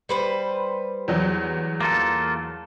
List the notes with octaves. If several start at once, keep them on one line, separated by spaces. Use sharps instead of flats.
G3 B4 C5
E2 F#3
A#3 F4 A4